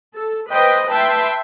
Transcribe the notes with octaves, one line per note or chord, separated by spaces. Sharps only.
A4
B4 C5 D#5 G5
B4 E5 G5 A5 C6